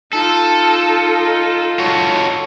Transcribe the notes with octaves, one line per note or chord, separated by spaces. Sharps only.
D#4 F4 A4
F#4 A4 C#5